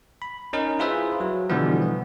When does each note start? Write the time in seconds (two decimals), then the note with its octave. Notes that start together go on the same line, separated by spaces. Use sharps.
0.22 B5
0.53 C#4 D#4 A#4
0.79 E4 F4 G#4 B4 C5 E5
1.20 F#3
1.49 B2 D3 E3 F3 G3 B3
1.82 B3